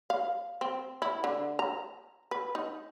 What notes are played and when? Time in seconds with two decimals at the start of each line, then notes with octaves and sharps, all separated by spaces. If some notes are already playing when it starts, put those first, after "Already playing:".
0.10 F5
0.61 C4
1.02 E4
1.24 D3
1.59 A#5
2.31 B4
2.55 D#4